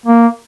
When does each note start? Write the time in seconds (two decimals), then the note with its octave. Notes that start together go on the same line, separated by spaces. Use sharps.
0.06 A#3